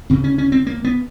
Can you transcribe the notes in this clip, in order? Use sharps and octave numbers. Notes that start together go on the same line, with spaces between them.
D2 C#3 C4
C#4
C#4
C4
A#3
B3